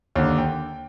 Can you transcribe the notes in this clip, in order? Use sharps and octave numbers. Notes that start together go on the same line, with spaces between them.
D#2 D3
G5